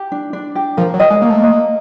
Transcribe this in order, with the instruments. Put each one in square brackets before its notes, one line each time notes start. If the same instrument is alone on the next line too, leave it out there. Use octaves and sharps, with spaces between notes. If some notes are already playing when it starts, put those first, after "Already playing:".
Already playing: [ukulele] G4
D4
D4
G4
[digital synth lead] F3 [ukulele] A#4
[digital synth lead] F#3
[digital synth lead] G3 [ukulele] D#5
[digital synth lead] G#3
[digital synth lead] A#3 [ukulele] A#4
[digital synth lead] A3
[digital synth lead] A#3 [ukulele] D#5